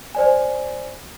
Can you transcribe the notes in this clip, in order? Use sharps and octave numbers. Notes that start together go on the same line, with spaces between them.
C5 D5 G#5